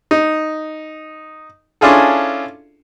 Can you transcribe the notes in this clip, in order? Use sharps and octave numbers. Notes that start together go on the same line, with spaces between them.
D#4
C#4 D4 E4 F4 G#4 A4